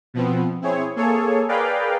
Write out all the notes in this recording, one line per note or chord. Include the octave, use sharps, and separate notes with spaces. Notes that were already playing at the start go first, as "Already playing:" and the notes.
B2 F3 B3 C4
C4 E4 G#4 C#5
A#3 G#4 A4 C#5
G#4 A#4 B4 D5 F5 G5